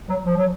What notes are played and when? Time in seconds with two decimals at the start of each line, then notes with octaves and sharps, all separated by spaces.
0.08 F#3
0.26 F3
0.36 F#3